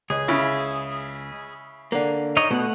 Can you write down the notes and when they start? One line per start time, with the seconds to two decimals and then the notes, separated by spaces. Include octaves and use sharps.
0.10 C#2 G#4
0.28 C#3 E4
1.92 D3 A#3
2.37 D#4 C#5 D#5
2.51 B2 A3 F#5